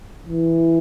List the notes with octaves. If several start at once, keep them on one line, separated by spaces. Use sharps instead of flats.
E3